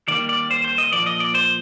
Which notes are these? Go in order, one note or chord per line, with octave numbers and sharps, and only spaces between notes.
D#3 G3 A#3 D5
D5
C5
C5
D#5
A#2 F3 A#3 D5
D#5
D5
C5